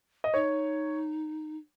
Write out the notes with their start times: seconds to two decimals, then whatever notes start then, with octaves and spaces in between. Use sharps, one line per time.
0.24 D#5
0.34 D#4 C#5